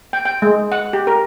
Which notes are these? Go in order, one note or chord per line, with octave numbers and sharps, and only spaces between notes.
G5
G5
G#3
F#5
G4
A#4